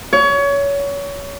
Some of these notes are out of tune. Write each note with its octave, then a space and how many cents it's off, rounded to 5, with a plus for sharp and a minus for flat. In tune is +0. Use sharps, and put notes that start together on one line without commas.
C#5 +25